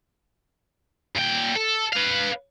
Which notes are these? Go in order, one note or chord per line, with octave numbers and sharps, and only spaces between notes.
A#2 G5
A4
B4 F5